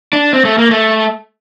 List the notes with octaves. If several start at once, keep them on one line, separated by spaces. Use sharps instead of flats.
D4
C4
A3
A#3
A3